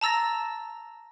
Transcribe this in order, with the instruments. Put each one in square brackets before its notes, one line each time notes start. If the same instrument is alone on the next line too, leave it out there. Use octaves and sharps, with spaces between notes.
[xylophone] A5 A#5 E6 A6 A#6